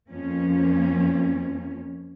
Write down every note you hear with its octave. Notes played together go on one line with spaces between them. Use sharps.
F2 F3 A#3 C#4